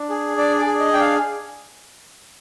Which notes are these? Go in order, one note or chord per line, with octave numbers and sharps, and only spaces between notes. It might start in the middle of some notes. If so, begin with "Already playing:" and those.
Already playing: D4
G#4
D4 D5
D5
G#4
D#5
D4 G5
F5